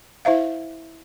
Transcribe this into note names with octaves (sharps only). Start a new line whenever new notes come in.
E4 C5 E5 F5